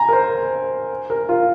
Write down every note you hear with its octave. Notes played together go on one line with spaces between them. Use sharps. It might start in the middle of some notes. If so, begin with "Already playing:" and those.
Already playing: G#5 A#5
A#4
C5
A#4
F4